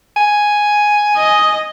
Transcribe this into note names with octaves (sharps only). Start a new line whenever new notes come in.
G#5
D#5